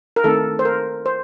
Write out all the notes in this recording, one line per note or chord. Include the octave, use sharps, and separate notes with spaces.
A#4
D#3 A3 C4 A4
C5
A#4
C5